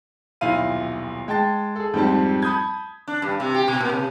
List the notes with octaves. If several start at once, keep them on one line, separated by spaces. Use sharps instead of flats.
D#1 B1 E4 F4 F5 D#7
G#3 G5 A5 A6
G#4 A4
F2 G#2 G3 C4 A5
A5 B5 D#6 G6 G#6
D4
G2
C3
G4
B2
A#2
C3